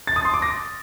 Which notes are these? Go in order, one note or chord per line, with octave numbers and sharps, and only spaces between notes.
A6
D#6
C6
D6
A#6